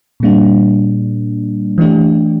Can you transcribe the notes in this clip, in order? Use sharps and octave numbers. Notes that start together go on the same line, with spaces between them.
A#2 G3 A#3 D4
E3 A3 D4 G4